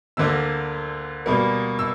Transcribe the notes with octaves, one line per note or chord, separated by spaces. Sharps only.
D2 D3 A#3 E6
B2 G3 A#3
E6